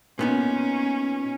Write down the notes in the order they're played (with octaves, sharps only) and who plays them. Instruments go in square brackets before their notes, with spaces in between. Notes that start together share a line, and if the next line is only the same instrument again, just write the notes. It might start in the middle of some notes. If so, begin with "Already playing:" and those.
[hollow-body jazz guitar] A#2 B3 D#4 [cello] C#4